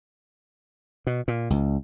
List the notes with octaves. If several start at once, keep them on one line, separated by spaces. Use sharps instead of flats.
B2
A#2
C#2